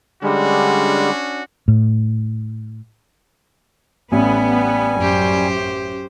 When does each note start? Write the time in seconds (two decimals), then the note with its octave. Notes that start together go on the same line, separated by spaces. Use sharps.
0.23 D3 G3 G#3 C#4 D4 F#4
1.68 A2
4.12 A1 G3 B3 G#5
4.99 F#2 C#4 G4 C5